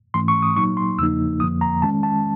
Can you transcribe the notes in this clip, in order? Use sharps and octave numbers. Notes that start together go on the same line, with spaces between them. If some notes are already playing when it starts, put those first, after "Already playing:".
G#2 E3 A3 C#4 C6
C#6
D#6
A#2 F#3 A#3 D#4 C#6
C6
E2 C#3 F3 A#3 D#4 E6
F2 D3 F3 A#3 D#6
A#5
D#3 G#3 C#4 A5
A5